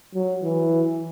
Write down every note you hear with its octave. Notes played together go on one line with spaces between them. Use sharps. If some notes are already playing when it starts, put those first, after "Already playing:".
F#3
E3